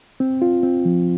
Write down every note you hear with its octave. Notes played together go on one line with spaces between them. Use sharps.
C4
F4
C4
F3